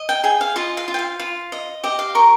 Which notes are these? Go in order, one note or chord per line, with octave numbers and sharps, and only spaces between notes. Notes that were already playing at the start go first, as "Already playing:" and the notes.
Already playing: D#5
G5
G#4 G5
F5
F4 D#5
F5
F4
G5
F5
F4
D#5
G4 D#5
F5
A#4 C#6